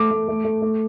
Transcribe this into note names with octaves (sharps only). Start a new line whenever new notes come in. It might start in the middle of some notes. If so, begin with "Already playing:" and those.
Already playing: A3 D6
A3
A3
A3
A3